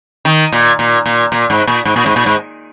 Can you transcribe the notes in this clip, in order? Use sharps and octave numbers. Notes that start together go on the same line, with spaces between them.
D#3
A#2
A#2
A#2
A#2
G#2
A#2
G#2
A#2
G#2
A#2
G#2